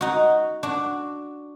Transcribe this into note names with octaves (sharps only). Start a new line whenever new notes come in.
D#4 F#4
D4 F#4